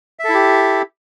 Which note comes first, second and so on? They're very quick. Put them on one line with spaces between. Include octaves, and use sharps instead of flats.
E5 A4 E4 G4